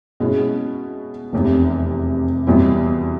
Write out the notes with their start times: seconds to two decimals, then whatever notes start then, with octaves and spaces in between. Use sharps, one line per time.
0.20 B2 G#3 C#4 E4 G#4
1.33 F1 E2 C3
2.47 E2 B2 G3 C4 E4